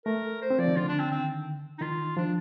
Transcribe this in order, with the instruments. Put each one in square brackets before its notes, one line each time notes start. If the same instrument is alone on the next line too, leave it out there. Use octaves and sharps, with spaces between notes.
[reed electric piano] A3 [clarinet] A#4
[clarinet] C5
[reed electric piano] C4
[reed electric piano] F3 [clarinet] D5
[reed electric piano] D#3
[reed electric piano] D3 [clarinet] F4
[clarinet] D4
C4
[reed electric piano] D#3 [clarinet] C4
[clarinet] D#4
[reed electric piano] D#3 [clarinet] F4
[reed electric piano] F3 [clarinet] D4